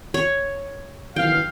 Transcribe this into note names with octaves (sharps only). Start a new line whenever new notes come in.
C#5
B1 D#3 E3 F5 G5